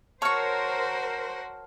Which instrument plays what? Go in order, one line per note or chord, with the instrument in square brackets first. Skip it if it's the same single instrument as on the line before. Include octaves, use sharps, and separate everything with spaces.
[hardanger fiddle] F#4 [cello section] A#4 C5 [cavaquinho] C#5 C#6 [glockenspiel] A5 F6